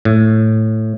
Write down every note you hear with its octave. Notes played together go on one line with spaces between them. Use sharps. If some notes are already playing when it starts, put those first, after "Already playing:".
A2